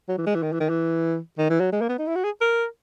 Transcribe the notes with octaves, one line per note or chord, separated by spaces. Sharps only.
F#3
E3
G#3
E3
D#3
E3
D#3
E3
D#3
E3
F#3
G#3
A#3
B3
D#4
E4
F#4
G#4
A#4